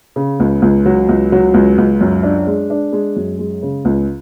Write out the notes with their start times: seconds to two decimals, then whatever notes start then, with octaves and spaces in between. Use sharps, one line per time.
0.16 C#3
0.40 C#2
0.62 C#2
0.86 F#3
1.09 C#2
1.32 F#3
1.54 C#2
1.78 C#2
2.01 F#2
2.23 D4
2.47 G#3
2.70 D4
2.93 G#3
3.16 F#2
3.39 G#3
3.63 C#3
3.85 C#2